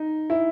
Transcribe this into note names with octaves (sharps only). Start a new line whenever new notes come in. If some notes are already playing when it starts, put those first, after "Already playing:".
Already playing: D#4
E4